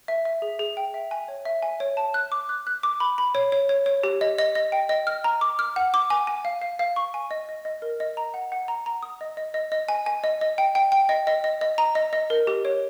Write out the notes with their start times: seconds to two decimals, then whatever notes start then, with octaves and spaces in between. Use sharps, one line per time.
0.08 E5
0.25 E5
0.42 G#4
0.59 G#4
0.77 G5
0.94 E5
1.11 G#5
1.28 C#5
1.45 E5
1.62 G#5
1.80 C#5
1.97 A5
2.14 F#6
2.32 D6
2.49 F#6
2.67 F#6
2.83 D6
3.00 B5
3.18 B5
3.35 C#5
3.52 C#5
3.69 C#5
3.86 C#5
4.03 G4
4.21 D#5
4.38 D#5
4.55 D#5
4.72 G5
4.89 D#5
5.07 F6
5.24 A#5
5.41 D6
5.59 F6
5.76 F#5
5.94 D6
6.10 G#5
6.27 G#5
6.45 F5
6.62 F5
6.79 F5
6.96 C#6
7.14 G#5
7.31 D#5
7.49 D#5
7.65 D#5
7.82 A#4
8.00 D#5
8.17 A#5
8.34 F#5
8.52 F#5
8.68 A#5
8.86 A#5
9.03 D#6
9.21 D#5
9.37 D#5
9.54 D#5
9.72 D#5
9.89 G#5
10.06 G#5
10.24 D#5
10.41 D#5
10.58 G5
10.75 G5
10.92 G5
11.09 D#5
11.27 D#5
11.44 D#5
11.61 D#5
11.78 A#5
11.95 D#5
12.13 D#5
12.30 A#4
12.47 G4
12.65 C#5